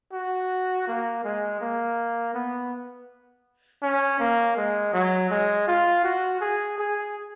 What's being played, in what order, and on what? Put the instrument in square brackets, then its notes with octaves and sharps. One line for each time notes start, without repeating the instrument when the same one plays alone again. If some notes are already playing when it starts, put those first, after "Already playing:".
[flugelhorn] F#4
A#3
G#3
A#3
B3
C#4
A#3
G#3
F#3
G#3
F4
F#4
G#4
G#4